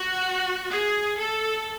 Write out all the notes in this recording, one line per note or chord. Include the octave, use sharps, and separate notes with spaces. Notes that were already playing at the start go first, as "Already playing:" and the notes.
Already playing: F#4
G#4
A4